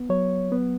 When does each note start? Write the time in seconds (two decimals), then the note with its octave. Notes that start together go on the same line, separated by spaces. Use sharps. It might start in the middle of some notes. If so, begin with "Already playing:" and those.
Already playing: B3
0.09 F#3 C#5
0.52 B3